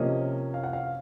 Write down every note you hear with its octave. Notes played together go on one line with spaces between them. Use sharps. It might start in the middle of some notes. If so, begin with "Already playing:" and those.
Already playing: C3 F3 A#3 C#4 D#5
F5
F#5
F5